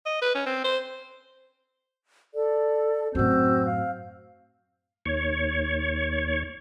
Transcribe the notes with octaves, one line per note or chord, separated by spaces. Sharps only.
D#5
B4
C#4
C4
C5
A4 D5
F#2 A2 C4 F#4 E6 G6
F5
D#2 C#5